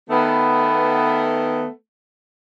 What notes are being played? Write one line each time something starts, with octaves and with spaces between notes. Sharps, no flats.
D#3 A3 B3